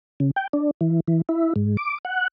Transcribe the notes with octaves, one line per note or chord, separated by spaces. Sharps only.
C#3
G5
D4
E3
E3
E4
G#2
D6
F#5